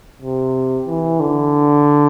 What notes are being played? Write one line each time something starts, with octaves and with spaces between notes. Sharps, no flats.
C3
E3
D3